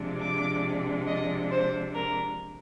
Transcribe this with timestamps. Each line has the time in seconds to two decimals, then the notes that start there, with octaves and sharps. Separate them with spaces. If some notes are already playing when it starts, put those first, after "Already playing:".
Already playing: C3 F3 G#3 D4
0.20 D6
1.07 D#5
1.51 C5
1.94 A#4